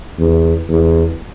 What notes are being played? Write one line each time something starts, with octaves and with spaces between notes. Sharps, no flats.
E2
E2